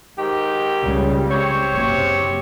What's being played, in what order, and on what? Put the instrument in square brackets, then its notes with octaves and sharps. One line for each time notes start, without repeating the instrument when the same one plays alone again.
[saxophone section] G#2 D#3 G4
[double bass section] C#2 C#3 G3
[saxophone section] C4 G4 C#5
[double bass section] F#1 C3